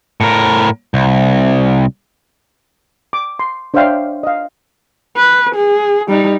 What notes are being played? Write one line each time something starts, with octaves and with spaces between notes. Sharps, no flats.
A2 A#4
C2
D6
C6
D4 C5 C#5 E5 F5 G5
D#5 F5
B4
G#4
G3 D#4